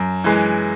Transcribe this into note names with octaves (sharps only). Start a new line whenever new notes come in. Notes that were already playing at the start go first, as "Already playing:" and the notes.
Already playing: F#2
E3 G#3